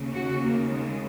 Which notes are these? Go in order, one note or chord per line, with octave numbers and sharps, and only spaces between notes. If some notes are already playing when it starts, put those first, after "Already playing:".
Already playing: D#2 C#3
F#4
A#3
G#3